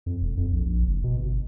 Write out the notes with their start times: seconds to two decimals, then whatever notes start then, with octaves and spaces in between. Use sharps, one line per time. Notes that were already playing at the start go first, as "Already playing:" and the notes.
0.06 F2
0.21 E1
0.37 F2
0.52 A#1
0.65 A#1
0.86 F#1
1.04 B2
1.17 G1